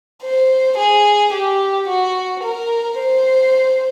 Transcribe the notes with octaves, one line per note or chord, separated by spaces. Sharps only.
C5
G#4
G4
F#4
A#4
C5